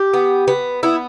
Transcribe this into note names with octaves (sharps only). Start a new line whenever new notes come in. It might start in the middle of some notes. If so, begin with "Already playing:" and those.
Already playing: G4
B3
B3
B3 E4